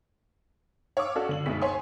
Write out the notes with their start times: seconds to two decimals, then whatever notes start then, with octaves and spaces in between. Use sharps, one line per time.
0.97 C#5 F5 C#6 D6 E6
1.15 C#4 D4 F#4 A4 F5
1.29 D3 F#7
1.46 F#1 D2 B2 G#3 D#4 B6
1.62 C5 C#5 G#5 C6